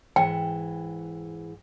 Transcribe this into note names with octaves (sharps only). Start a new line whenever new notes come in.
G#2 E3 G5